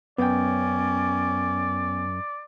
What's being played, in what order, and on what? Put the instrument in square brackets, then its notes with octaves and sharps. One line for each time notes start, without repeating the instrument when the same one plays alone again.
[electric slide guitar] F#2 [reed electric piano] B3 G5 [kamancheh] C#4 [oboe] D5